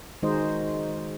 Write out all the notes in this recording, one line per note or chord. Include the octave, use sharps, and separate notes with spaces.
D#3 G#3 D#4 F#4 C5 D#5